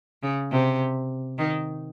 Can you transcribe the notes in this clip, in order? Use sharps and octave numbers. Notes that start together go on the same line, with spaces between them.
C#3
C3
D#3